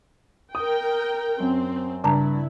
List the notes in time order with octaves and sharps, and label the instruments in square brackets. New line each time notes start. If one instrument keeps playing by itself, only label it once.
[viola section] A#4 G5 [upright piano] D#6
[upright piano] F#2 [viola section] C4
[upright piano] G2 [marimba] C#3 A5 A#5 [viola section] E4